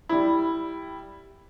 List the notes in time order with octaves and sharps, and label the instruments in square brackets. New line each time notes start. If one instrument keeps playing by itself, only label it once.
[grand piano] G3 E4